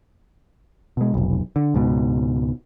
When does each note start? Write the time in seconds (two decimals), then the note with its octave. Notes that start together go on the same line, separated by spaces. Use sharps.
0.97 B2 G#3
1.14 F1 B1
1.56 D3
1.75 C#2 G#2 B2